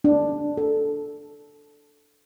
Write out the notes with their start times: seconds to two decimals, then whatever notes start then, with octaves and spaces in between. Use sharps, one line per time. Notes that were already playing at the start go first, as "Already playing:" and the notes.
0.04 D4
0.57 A4